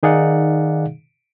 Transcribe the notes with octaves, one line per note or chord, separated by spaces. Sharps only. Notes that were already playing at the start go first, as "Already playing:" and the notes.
D#3 D#4 G#4 D5 F5 F#5